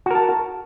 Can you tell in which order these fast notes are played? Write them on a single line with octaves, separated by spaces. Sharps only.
F#4 A#4 A5